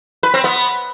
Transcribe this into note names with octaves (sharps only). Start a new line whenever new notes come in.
B4
C4
B3